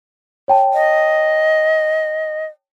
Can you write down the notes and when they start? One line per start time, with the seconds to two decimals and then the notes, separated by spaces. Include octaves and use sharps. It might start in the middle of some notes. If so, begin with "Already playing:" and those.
0.48 C#5 G5 A5
0.74 D#5